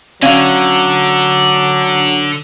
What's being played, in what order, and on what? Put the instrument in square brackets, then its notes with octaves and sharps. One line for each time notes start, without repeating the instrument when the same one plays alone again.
[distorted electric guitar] D3 [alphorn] F#3 [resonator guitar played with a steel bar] C#4 F5